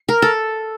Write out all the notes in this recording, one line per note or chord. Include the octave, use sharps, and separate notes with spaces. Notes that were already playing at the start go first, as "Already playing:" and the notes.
Already playing: C5
A#4
A4